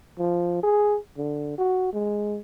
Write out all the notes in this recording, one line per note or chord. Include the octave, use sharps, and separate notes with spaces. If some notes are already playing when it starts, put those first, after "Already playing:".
F3
G#4
D3
F#4
G#3